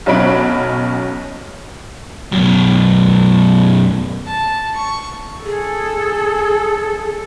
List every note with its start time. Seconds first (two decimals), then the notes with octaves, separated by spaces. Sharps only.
0.06 B1 B2 F#3 C#4 B5 D7
2.32 F#2 B2
4.27 A5
4.76 C#6
5.45 G#4 A4